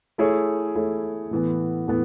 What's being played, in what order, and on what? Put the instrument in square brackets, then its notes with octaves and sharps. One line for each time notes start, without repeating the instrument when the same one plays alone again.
[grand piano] A3 E4 G#4 C#5
A3 E4 G#4 C#5
A2 E3 B3
A2 E3 B3